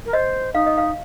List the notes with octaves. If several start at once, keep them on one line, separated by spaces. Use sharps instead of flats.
A#4
C5 D#5
D#4 F5
D#5
F5